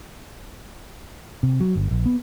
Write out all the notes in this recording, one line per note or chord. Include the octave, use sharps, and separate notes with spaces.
C3
F#3
G1
A#1
B3